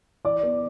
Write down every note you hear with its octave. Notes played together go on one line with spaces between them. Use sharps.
E3 D5 D6
B3